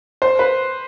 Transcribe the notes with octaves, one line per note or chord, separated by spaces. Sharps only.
C5
B4